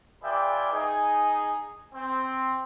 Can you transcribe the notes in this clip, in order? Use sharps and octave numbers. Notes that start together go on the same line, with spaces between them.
F4 G#4 B4 D5 E5 G5
D#4 G#4
C4